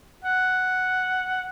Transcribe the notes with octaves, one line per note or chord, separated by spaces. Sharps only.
F#5